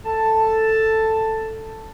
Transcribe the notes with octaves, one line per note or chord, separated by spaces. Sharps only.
A4 A5